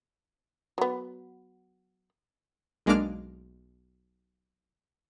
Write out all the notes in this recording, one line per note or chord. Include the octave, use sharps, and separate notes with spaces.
F#3 B3
B1 G#3 A#3 D4 D6 F6